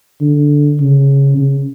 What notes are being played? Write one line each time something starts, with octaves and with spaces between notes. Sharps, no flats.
D3
C#3
C#3